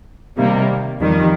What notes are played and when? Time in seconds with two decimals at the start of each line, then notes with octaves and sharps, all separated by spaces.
0.37 C3 D#3 G3 A#3
1.01 F2 D#3 G3